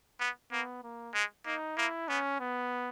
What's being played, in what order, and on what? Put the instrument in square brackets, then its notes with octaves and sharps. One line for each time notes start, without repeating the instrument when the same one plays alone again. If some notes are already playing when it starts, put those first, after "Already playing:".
[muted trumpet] B3
[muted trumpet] A#3 [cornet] B3
[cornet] A#3
[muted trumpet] G#3
[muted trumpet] A#3 [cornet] D#4
[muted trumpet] A#3 [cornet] E4
[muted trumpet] B3 [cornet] C#4
[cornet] B3